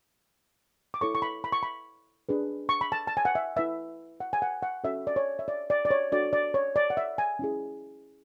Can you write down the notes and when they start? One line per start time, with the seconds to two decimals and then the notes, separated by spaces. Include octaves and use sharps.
0.94 D6
1.01 E4 A4 C#5 C#6
1.15 C#6
1.22 B5
1.44 B5
1.52 C#6
1.63 B5
2.29 D4 G#4 B4
2.69 C#6
2.81 B5
2.92 A5
3.07 A5
3.17 G#5
3.25 F#5
3.35 E5
3.56 E4 B4 E5
4.20 F#5
4.33 G#5
4.42 F#5
4.62 F#5
4.84 C#4 F#4 A4 C#5 E5
5.07 D5
5.16 C#5
5.39 E5
5.48 D5
5.70 D5
5.85 D5
5.91 C#5
6.12 D4 F#4 A4 D5
6.33 D5
6.54 C#5
6.76 D5
6.90 F#5
6.97 E5
7.18 G#5
7.39 C#4 E4 G#4